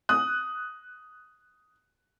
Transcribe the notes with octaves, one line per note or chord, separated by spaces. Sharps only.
D#6 F#6